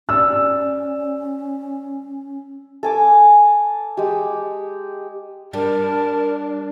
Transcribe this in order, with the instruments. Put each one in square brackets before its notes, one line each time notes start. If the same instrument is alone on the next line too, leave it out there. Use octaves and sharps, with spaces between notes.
[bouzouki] G3 [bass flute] C#4 [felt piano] E6
[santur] A4 G#5 D6
G#3 G4
[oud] G3 [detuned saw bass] D4 [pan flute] A#4 [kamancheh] A5